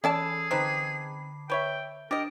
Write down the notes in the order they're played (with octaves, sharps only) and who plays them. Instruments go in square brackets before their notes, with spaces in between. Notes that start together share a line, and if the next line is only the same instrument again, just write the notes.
[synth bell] E3 A4 [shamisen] C#4 D5 A5 [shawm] G#4
[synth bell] D3 B5 [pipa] C4 D#4 B4
[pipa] B4 C#5 E5 [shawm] G5
[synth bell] D4 [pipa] G4 D#5 [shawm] A#4